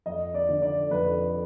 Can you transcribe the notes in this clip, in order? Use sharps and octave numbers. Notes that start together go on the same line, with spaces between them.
F2 D#5
D5
D3
D5
F2 B4